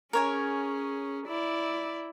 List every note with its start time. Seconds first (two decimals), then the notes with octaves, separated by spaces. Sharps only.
0.13 C#4 G#4 A#4 C#5 G#5
1.27 E4 D5